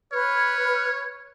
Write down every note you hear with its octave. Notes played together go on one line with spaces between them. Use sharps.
B4 C#5 F6